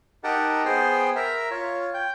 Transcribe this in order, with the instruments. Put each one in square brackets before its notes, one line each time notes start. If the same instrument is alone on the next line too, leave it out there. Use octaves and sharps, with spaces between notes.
[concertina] D#4 G4 A#4 F#5 A5
B3 G#4 C5 G5
A#4 E5
F4 C#5
G5